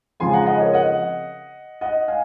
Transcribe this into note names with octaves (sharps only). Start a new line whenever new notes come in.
C#3 F3 G#3 C4 G#5 C6
F#5 A#5
D#5 F#5
A#4 C#5
D#5 F#5
D#5 F#5
F5 G#5